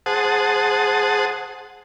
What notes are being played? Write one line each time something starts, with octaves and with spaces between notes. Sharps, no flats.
G#4 C5 F#5 A5 D#6